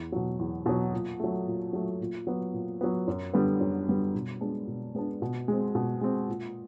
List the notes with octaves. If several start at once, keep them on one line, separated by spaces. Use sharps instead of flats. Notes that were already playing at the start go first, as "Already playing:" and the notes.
Already playing: E2
B2 F#3
E2
B2 F#3
A#2
F#3 A3
A#2
F#3 A3
A#2
F#3 B3
A#2
F#3 B3
F#2
D3 G3 B3
F#2
D3 G3 B3
B2
G#3 B3 D4
B2
G#3 B3 D4
B2
G#3 C4
B2
G#3 C4
A#2